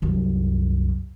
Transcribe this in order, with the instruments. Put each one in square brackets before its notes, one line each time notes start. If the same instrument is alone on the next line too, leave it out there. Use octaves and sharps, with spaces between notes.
[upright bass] C2 F#2